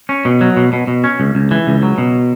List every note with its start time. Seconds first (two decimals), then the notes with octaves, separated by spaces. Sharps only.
0.09 C#4
0.25 B2
0.41 F#3
0.56 B2
0.73 B2
0.87 B2
1.04 C#4
1.20 C#2
1.35 C#2
1.51 E3
1.67 C#2
1.83 F#3
1.98 B2